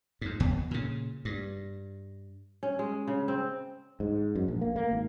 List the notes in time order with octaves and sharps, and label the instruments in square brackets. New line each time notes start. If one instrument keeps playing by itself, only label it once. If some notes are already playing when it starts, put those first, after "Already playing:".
[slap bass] F2 G#2
F#1 D#2 B2 B3
A#2 C#3
G2
[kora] C#4
G#3
C#3
C4
[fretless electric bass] G#2
F#2
A#1
A#3
A#3
G#1